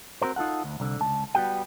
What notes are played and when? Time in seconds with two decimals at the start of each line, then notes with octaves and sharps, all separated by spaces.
0.22 C4 F#4 A#4 C5
0.36 D#4 F4 A4 F#5
0.64 D2
0.80 C2 D3
1.01 C#2 A5
1.35 G3 B3 F#4 G#4 G5